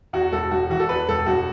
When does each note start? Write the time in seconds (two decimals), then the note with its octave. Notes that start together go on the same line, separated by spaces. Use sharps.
0.13 E2 F#4
0.32 E1 A4
0.51 E1 F#4
0.70 E3 F#4
0.80 A4
0.89 E2 B4
1.08 E1 A4
1.26 E1 F#4